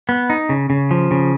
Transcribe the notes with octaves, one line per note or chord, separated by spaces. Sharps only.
B3
D#4
C#3
C#3
F3
C#3